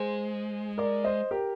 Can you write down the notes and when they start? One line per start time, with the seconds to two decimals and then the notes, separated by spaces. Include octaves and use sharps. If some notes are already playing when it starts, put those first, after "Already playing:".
Already playing: G#3 G#4 C5
0.78 A#4 D5
1.04 C5 D#5
1.31 G4 A#4